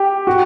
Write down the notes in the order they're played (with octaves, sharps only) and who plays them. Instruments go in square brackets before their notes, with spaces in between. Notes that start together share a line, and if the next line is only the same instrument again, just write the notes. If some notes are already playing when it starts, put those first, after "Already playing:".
Already playing: [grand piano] G4
F#4